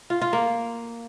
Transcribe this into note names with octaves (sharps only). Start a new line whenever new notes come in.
F4
F4
A#3